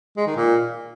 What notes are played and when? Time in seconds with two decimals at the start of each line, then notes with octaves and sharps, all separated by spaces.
0.17 G#3
0.27 D#3
0.37 A#2